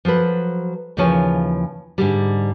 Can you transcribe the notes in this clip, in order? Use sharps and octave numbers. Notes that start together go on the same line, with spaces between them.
F3 F#3 A4 B4
D#2 C#3 E3 F3 C#5 G#5
G#2 D3 G3